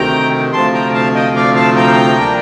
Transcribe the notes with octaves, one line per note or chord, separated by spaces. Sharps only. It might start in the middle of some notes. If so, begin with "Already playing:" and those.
Already playing: D2 C3 D#3 G5 A#5
D2 C3 F3 A5 C6
G5 A#5
F5 A5
D#5 G5
D5 F5
F5 A5
G5 A#5
A#2 G3 D4